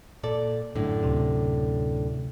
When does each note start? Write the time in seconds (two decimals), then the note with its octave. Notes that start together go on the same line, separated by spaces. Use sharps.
0.23 A#2 A4 D5
0.75 F#2 A2 D3
1.03 D2 C3